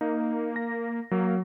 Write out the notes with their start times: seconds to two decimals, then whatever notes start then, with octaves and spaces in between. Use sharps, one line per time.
0.01 A#3 D#4
0.56 A#6
1.11 F#3 A#3